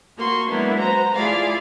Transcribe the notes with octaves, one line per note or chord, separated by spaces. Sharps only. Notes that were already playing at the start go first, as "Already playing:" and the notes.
A#3 F#4 C6 C#6
F#3 G#3 A#3 B3 D4 E4
F#4 B4 C5 A#5
A3 E4 F4 G#4 D5 F5